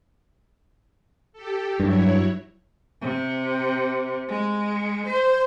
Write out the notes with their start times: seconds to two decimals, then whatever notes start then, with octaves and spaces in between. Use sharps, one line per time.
1.33 G4 A4
1.80 G2 F#3 E4 C#5
3.01 C3
4.28 G#3
5.06 C5